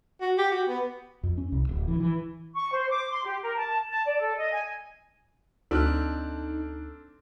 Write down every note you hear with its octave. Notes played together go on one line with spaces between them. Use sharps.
F#4
G4
F#4
B3
F2
C#4
C2
D1
E3
E3
C#6
C5
D6
C6
G4
A#4
A5
A5
D5
A4
D#5
G#5
D2 C4 D4 D#4 A4 F6 F#6